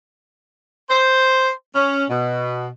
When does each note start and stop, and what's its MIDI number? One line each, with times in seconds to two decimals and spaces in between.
0.89 1.50 72
1.75 2.04 61
2.10 2.67 47